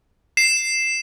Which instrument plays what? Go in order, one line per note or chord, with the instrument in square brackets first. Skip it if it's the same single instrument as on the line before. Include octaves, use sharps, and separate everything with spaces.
[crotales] C7 E7